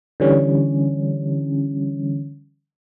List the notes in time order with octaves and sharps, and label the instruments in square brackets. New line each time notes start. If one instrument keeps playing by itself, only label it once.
[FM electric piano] D3 E3 G3 C#4